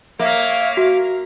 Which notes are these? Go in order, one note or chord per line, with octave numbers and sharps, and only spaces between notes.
A#3 C#5 E5 F5
F#4